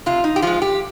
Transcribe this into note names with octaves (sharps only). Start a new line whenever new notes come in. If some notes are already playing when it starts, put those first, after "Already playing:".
C3 F4
D#4
G4
F3 G#3 F4
G4